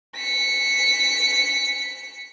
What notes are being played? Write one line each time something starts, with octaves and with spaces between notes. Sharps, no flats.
B6 C#7